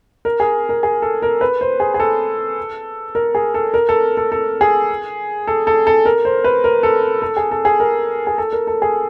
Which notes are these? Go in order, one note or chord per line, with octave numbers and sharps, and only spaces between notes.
A#4
G#4
A#4
G#4
A4
A#4
B4
C5
G#4
G#4
A4
A#4
G#4
A4
A#4
A4
A4
A4
G#4
A4
A4
A4
A#4
C5
B4
A#4
A4
A4
G#4
A4
G#4
A#4
G#4
A4
A#4
A4
G#4